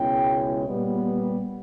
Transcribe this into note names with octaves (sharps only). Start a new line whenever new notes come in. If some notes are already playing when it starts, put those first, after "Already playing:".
Already playing: C#2 B2 G#3 C#4 E4 G5
A#2 G3 B3